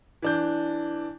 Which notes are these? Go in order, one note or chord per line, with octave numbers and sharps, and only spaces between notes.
E3 D4 G6